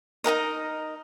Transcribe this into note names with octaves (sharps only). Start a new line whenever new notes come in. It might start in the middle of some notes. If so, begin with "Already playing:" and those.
D#4 F#4 A#4 D#5